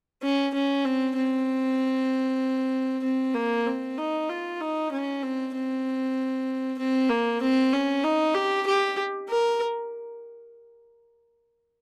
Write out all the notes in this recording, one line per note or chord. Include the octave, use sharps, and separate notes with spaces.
C#4
C#4
C4
C4
C4
A#3
C4
D#4
F4
D#4
C#4
C4
C4
C4
A#3
C4
C#4
D#4
G4
G4
A#4